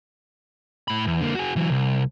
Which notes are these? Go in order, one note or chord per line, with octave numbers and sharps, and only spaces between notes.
A2 B5
E2
D3 A#3
F#4 G#4
E3 F#3
C2